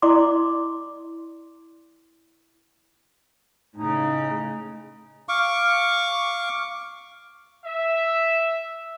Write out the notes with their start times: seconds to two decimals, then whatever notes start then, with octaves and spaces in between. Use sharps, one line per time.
0.02 E4 D5 C6 D6
3.76 A2 C#3 D#4
5.29 F5 C#6 D6
7.65 E5